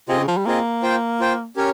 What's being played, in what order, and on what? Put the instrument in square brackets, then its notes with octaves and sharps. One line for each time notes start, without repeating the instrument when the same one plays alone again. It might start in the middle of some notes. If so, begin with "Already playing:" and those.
[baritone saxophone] C3 [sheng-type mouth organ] C4 F4 G#4 D#5
[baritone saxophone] C#3
F3
G3
[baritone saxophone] A#3 [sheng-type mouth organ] C4 F4 G#4 D#5
[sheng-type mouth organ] F4 C5 G5
F4 C5 G5
C#4 G4 A#4 C#5